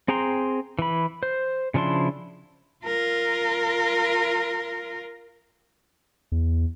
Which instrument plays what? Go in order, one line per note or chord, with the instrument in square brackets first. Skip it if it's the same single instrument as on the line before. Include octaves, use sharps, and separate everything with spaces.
[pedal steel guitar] C4 G#4 G5 A#5 C6
E3 B5
C5
C#3 F3 D4 E4 C6
[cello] F4 A#4
[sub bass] E2